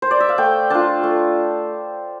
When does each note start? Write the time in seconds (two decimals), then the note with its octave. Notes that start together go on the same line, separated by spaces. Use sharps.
0.02 C5
0.11 D5
0.20 E5
0.29 F5
0.38 A3 G5
0.70 D4 F4 A5
1.03 A3